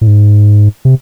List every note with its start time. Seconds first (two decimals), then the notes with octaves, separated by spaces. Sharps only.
0.01 A2
0.07 G#2
0.85 C3